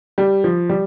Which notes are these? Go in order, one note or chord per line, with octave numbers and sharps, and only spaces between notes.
G3
F3
G3